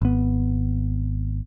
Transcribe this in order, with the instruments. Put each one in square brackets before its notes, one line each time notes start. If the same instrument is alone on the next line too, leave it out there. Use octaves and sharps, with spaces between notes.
[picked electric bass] G#1 B3